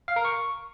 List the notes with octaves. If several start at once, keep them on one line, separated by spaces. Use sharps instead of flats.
F5
A#4
C#6